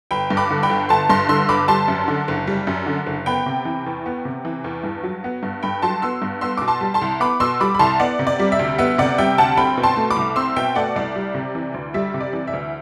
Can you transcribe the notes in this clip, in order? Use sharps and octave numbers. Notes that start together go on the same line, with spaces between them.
G1 G5 B5
G2
B5 D6
D3
G5 B5
G1
G1 A5 C6
G2 A5 C6
D3 C6 E6
G1 B5 D6
G3 A5 C6
F#2
D3
F#1
G3
F#2
D3
F#1
B3 G5 B5
C3
E3
E2
B3
C3
E3
E2
G2
F#3
B3
G2
G2 G5 B5
F#3 A5 C6
B3 C6 E6
G2
B3 C6 E6
B2 D6
A5 C6
G3
A5 C6
C2
B3 B5 D6
B2 C6 E6
G3 B5 D6
B5
C2 A5 C6
B3 D5 F#5
C3
D5
G3
E5
D2
B3 E5
C3 D5 F#5
G3 E5 G5
D2 F#5 A5
C4 G5 B5
B2
A5 C6
A3
B5 D6
C2
C4 C6 E6
B2 E5 G5
A3 D5 F#5
C2 D5
G3
C3
E3
D2
G3 E5
C3
D5
E3
E5
D2